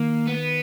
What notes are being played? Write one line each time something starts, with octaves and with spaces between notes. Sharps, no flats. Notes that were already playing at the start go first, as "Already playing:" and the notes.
Already playing: D#3 A#3
B3